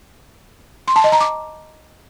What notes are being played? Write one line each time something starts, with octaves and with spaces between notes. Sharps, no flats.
C6
A5
D#5
A#5
D6